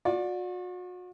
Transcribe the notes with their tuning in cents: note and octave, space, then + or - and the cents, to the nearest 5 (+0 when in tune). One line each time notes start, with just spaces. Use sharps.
F#4 -40 D5 +0